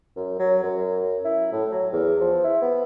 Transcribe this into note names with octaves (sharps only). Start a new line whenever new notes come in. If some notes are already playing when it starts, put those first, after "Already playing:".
F#2
F#3
F#2
E4
A2
F#3
E2
F3
E4
B3